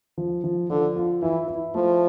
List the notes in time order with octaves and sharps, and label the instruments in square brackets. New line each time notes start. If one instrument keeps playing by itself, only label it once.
[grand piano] F3
F3
[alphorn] D3 [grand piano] F3
[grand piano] F4
[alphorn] E3 [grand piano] E4
[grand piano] E4
[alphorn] F3 [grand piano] A3